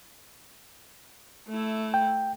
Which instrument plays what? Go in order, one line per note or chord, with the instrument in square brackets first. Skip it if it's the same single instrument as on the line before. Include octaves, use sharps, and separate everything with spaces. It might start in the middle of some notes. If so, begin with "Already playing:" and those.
[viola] A3 E4
[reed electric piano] G5